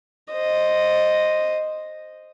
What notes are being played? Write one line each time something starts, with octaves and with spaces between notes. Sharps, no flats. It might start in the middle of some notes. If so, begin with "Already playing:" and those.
C5 D#5